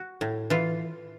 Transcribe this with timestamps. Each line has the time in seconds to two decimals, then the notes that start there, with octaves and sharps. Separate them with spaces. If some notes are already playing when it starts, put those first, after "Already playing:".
Already playing: F#4
0.21 A2
0.50 E3 F4